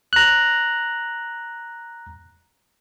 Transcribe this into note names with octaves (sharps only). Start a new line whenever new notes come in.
A#5 F#6